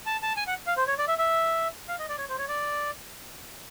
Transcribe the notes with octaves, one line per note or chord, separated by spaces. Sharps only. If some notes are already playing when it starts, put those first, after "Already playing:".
A5
A5
G#5
F#5
F5
C5
C#5
D5
E5
E5
F5
D#5
D5
C#5
C5
C#5
D5